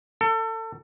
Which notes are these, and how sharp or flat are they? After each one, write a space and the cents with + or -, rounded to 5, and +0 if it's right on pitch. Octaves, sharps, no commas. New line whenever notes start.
A4 +30